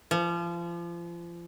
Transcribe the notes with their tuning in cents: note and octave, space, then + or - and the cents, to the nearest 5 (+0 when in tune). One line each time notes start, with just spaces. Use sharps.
F3 -30